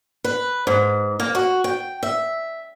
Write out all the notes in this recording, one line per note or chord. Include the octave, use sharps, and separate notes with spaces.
B4
G#2
A#3
F#4
G5
E5